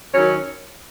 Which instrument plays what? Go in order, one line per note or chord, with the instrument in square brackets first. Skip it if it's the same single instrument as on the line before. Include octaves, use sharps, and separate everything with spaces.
[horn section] D#3 F#3 C#4